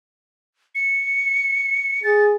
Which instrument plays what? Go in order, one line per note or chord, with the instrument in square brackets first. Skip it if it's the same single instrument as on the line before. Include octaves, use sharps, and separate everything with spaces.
[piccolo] C#7
[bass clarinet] G#4 [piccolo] A6